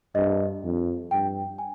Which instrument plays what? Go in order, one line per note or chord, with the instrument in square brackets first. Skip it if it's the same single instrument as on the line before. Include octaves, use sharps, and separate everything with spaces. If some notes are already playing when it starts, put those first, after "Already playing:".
[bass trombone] G2 [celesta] D#5
[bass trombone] F2
[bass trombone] G2 [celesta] G5
[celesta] G#5